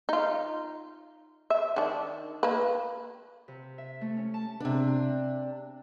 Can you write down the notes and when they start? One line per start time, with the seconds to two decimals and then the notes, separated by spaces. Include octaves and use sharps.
0.09 D#4 F4
1.50 E5
1.76 D#3 D4
2.43 A#3 B4
3.48 C3
3.78 E5
4.01 A3
4.17 C#4
4.34 A5
4.60 C3 D4